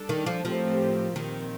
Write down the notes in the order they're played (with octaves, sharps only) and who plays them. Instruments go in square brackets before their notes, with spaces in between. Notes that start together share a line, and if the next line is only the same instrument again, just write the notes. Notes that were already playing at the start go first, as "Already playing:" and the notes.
Already playing: [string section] G3 D4 A4
[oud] D#3
F3
[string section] A2 A3 C4 G4 A#4 [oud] F3
[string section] A#2 F3 C4 [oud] D#3